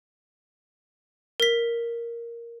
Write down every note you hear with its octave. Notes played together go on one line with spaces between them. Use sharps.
A#4 B6